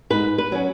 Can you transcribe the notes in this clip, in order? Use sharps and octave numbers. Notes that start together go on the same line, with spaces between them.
G#2 B4
B4
F#3 C#4